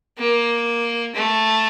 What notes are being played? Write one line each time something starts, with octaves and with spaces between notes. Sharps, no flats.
A#3
A3